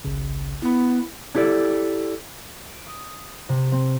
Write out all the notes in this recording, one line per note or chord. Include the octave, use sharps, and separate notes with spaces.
G#1 C#2 C#3
B3 E4 B5
D4 E4 G4 A4 D5
D7
D#6
C3
C4